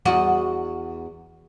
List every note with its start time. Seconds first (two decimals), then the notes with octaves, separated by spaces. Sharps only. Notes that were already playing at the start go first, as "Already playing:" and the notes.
0.05 E2 F#4 D#5